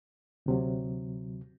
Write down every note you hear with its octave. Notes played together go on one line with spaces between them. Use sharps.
D2 C3 F#3